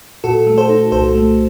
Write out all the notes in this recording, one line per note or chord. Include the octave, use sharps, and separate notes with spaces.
A#2 F#4 A4
A3
A4 C5
D#4
C2 A4 C5
A3